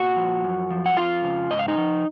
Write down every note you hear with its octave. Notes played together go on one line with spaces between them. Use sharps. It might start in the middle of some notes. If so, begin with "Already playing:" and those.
Already playing: A#2 F#4 F#5
F3
F#2
F3
F#5
F2 F4 F5
C#3
G#2 D#5
F5
D#4 D#5
F3